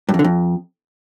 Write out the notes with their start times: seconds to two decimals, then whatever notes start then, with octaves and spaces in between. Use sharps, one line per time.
0.09 G2
0.14 F2
0.19 D3
0.24 F2